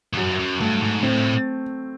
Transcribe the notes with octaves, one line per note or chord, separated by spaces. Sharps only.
F2
F#2 F#3
F#2
G2 A3
G#2
A2 C4